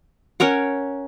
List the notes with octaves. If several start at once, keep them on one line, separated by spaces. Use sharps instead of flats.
C#4 A#4 C#5 F#5